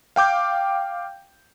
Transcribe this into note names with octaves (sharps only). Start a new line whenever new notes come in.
F5 G5 D6 G6